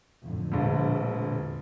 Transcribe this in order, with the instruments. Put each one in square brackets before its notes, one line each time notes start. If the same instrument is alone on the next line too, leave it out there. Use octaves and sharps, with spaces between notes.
[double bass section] F2 A2 D3
[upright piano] E1 A#1